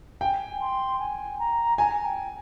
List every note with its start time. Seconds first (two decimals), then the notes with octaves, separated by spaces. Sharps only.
0.21 G5 G#5
0.60 C6
0.99 G#5
1.39 A#5
1.78 G#5 A#5
2.04 G5